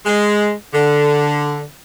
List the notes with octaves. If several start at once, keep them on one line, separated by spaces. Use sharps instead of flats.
G#3
D3